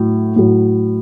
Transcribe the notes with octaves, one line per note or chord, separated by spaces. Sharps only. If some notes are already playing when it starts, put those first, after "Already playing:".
Already playing: A2 F#3
A2 F#3